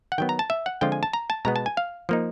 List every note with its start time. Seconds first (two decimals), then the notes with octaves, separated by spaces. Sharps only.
0.12 F#5
0.18 D#3 F#3 B3 G5
0.29 A#5
0.39 A5
0.50 E5
0.66 F#5
0.81 D3 F3 G#3 C4 F4 G5
0.92 G#5
1.03 A5
1.13 A#5
1.30 A5
1.45 B2 G#3 B3 A#5
1.56 A5
1.66 G#5
1.77 F5
2.09 F3 A#3 D#4